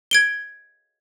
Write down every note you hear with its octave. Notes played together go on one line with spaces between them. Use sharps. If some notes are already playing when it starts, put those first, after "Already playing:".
G#6 D7 G7